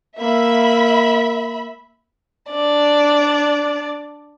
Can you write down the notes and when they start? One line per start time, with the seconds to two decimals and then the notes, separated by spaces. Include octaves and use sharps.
0.20 A#3 E5 B5
2.51 D4 D5